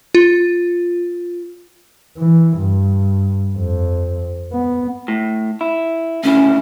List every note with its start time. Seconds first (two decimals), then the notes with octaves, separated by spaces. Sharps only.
0.15 F4
2.18 E3
2.58 G2
3.57 F2
4.53 B3
5.08 A2
5.61 E4
6.24 D2 C#3 C#4 E4